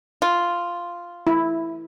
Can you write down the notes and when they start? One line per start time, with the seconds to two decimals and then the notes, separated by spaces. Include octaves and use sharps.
0.22 F4
1.27 E4